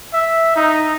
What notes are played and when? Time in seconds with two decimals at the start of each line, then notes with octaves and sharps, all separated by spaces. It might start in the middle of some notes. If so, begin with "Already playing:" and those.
0.13 E5
0.56 D#4